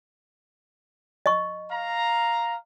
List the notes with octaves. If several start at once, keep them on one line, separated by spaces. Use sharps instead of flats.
D#5 C#6
F5 A#5